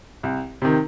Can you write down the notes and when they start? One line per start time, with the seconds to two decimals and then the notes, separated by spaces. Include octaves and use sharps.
0.23 C2
0.62 C3 D#3